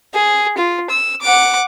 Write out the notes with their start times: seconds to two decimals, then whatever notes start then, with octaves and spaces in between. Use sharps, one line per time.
0.14 G#4
0.58 F4
0.90 E6
1.22 F#5 D6